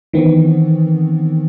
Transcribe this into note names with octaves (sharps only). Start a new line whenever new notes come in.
D#3 E3 B3 C4